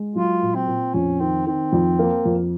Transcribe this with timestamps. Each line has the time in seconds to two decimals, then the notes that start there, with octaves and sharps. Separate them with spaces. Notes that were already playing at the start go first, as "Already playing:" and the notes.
Already playing: G#3
0.15 F#3 F4
0.42 A#2
0.55 C4
0.67 A#2
0.94 F2 C#4
1.20 D#3 C4
1.47 D#3 C4
1.73 F2
1.99 A#3
2.25 F2